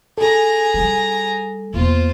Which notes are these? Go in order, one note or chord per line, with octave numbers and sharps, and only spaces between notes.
G#4 A4 A#5
G3
E2 A#3 F4 C5